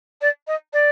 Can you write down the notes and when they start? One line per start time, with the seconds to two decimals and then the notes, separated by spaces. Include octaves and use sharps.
0.21 D5
0.47 D#5
0.73 D5